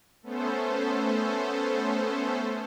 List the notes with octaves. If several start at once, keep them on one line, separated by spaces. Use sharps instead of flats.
A3 B3 C#4 A4 C5